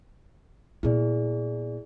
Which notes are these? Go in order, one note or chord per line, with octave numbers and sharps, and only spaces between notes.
A#2 B3 E4 G#4 D5